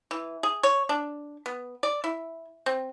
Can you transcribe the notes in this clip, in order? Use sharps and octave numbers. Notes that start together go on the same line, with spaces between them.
E3
G#4
C#5
D4
B3
D5
E4
C4